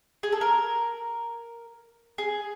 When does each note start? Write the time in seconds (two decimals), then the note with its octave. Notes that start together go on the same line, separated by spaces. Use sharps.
0.23 G#4
0.32 A4
0.41 A#4
2.18 G#4